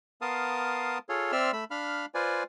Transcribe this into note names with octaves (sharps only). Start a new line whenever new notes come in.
B3 A#4 F5 A5 C6 D#6
F4 G#4 A4 C#5 C6
C4 D5 E5 C6 E6 F6
A3 B5 E6
D4 F5 B5 F6
F4 B4 C5 D5 G#5